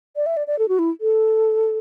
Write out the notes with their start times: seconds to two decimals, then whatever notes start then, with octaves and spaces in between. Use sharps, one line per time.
0.16 D5
0.26 E5
0.37 D5
0.47 D5
0.59 A4
0.68 F#4
0.79 E4
1.01 A4